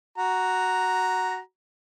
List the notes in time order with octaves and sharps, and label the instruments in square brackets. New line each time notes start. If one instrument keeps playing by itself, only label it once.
[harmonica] F#4 A#5